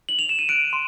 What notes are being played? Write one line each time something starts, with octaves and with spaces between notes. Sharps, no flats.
F#7
F7
E7
D#7
F#6 D7
C6